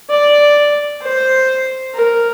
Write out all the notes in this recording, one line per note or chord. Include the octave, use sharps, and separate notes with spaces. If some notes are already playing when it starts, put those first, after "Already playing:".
D5
C5
A#4